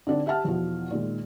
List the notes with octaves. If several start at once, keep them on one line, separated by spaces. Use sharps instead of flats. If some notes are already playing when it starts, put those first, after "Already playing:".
D3 C4 D4 D#4
G4 E5 F#5 A5 F6
E2 B2 F3
A#2 D#3 G#3